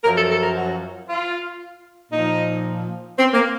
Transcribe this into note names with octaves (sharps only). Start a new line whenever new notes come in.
F#2 F3 A#4
A4
A4
A#4
F#4
F4
A#2 F3 D#4
C4
A#3